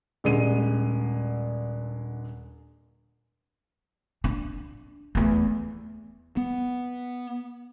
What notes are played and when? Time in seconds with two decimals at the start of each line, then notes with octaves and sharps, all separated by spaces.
0.24 D#1 D3 G#3 D#7
4.24 D4
5.15 E2 A3
6.37 B3